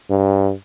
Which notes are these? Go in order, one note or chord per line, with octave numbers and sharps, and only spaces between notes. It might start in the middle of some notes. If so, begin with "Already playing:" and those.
G2